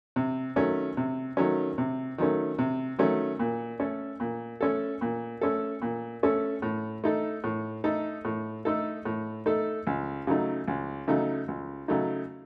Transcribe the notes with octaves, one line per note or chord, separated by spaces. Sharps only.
C3
D#3 F#3 A3 C#4
C3
D#3 F#3 A3 C#4
C3
D#3 F#3 A3 C#4
C3
D#3 F#3 A3 C#4
A#2
A3 C#4 A4
A#2
A3 C#4 A4
A#2
A3 C#4 A4
A#2
A3 C#4 A4
A2
A3 D#4 A4
A2
A3 D#4 A4
A2
A3 D#4 A4
A2
A3 D#4 A4
C#2
C#3 F#3 A3 D#4
C#2
C#3 F#3 A3 D#4
C#2
C#3 F#3 A3 D#4